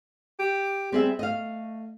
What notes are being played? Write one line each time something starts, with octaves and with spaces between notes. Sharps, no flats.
G4
G3 C4 G#4 E5
A3 D#5 F5